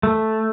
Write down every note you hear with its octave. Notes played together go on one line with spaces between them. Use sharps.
A3